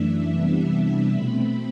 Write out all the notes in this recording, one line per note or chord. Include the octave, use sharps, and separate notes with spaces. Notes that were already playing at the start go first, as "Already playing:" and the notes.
Already playing: F#2 E3 A3 D4 E5
C3 E3 G3 B3 D4
B2 A3 C4 B5